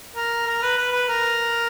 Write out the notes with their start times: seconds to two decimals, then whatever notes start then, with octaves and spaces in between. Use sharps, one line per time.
0.16 A#4
0.46 A#4
0.62 B4
0.77 B4
0.92 B4
1.08 A#4